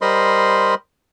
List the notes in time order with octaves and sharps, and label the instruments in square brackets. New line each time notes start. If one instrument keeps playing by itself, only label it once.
[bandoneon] G3 A#4 C5 D#5 B5 C6